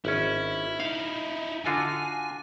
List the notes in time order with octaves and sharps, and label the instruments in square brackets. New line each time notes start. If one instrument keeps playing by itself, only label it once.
[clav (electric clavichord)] G#1 C#4 [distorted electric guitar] E4
[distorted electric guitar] D#4 E4 [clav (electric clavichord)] F5
[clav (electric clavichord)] D3 F4 F#4 [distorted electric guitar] G#5